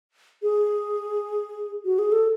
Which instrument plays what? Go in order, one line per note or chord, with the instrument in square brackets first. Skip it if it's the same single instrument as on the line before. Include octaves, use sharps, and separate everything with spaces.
[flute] G#4
F#4
G#4
A4